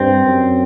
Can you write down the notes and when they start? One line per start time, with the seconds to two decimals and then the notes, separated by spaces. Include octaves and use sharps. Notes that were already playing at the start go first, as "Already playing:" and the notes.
Already playing: G2 C4
0.24 F#2